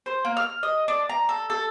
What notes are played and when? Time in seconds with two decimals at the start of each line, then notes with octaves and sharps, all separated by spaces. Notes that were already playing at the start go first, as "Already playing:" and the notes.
0.06 C5
0.25 A#3
0.37 F6
0.63 D#5
0.88 D4
1.09 A#5
1.29 A4
1.50 A4